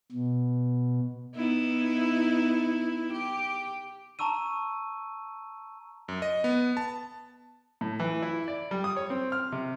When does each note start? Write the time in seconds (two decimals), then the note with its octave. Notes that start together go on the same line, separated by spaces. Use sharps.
0.12 B2
1.35 B3 D#4 E4
3.12 G4
4.19 A5 A#5 C#6 E6 D#7
6.08 F#2
6.22 D#5
6.44 B3
6.77 A5
7.81 A2
8.00 E3
8.23 E4
8.48 D5
8.71 G3
8.84 D#6
8.97 C#5
9.10 C4
9.32 F6
9.52 C3